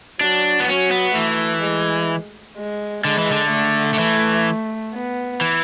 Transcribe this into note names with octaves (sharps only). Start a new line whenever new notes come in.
F#3 D4
B3
F#3 C#4
B3
E3 A3
G#3
G#3
D3 G#3
E3
D3
A3
D3
E3
B3
E3